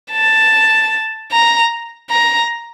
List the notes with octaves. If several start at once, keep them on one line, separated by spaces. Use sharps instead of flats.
A5
A#5
A#5